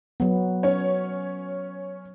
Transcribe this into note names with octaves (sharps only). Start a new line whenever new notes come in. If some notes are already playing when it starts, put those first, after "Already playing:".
F#3 B3
C#4 C#5